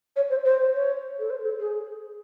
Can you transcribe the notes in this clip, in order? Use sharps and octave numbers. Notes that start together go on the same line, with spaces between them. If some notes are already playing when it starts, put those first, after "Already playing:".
C#5
C5
C5
C#5
A4
C5
A4
G#4